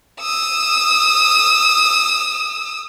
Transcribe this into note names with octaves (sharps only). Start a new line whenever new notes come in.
D#6 E6